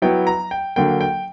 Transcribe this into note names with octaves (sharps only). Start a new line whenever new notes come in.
F#3 B3 E4 G5
A#5
G5
D3 F#3 A#3 G5
G5